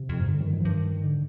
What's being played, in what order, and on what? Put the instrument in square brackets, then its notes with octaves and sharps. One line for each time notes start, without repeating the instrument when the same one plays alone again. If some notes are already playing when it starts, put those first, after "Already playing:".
Already playing: [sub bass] C3
[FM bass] F2
G#2
[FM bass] G2 [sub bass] D3
[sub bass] D#3
D#3
F3
[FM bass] G2 [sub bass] D#3
[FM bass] G#2 [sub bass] D3